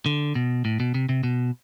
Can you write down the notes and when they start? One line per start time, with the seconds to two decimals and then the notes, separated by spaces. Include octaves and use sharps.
0.06 D3
0.35 B2
0.65 A2
0.80 B2
0.94 C3
1.09 C3
1.23 B2